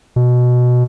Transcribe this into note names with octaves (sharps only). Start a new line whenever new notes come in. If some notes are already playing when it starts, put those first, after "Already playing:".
B2